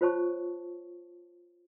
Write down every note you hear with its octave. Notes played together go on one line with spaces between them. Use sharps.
F4 C5 C#5 A5 C#6